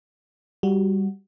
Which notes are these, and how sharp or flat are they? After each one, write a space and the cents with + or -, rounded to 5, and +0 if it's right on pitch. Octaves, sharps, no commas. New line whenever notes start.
G3 +0 F#4 +0